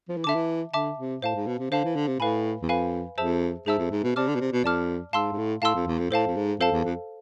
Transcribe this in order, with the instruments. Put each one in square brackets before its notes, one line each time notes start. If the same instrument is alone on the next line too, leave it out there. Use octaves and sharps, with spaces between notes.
[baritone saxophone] F3
E3
[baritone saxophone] D3 [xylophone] E5 A5 D6
[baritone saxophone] E3
[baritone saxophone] D3 [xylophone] E5 A5 D6
[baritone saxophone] C3
[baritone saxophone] A2 [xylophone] C5 F5 A5
[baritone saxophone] G#2
B2
C3
[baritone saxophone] D3 [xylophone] C5 F5 A5
[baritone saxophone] E3
D3
C3
[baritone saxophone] A2 [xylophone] B4 F5 G#5 B5
[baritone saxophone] E2
[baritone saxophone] F2 [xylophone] B4 F5 G#5 B5
[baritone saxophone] F2 [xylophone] G#4 C5 E5 A5 E6
[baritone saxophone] G#2 [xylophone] G#4 C5 E5 A5 E6
[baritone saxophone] F2
G#2
B2
[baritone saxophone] C3 [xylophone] D5 A5 D6 F6
[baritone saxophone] D3
B2
C3
B2
[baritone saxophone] F2 [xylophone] D5 A5 D6 F6
[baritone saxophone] G#2 [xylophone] F5 A5 C6 E6
[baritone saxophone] G#2
A2
[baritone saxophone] A2 [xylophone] F5 A5 C6 E6
[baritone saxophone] F2
E2
F2
[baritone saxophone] A2 [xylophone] A4 C5 F5 A5
[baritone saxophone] F2
G#2
[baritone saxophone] F2 [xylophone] A4 C5 F5 A5
[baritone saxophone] E2
F2